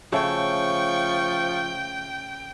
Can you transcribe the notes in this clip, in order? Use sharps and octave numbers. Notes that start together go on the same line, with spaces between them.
C#3 F3 A3 G5 C#6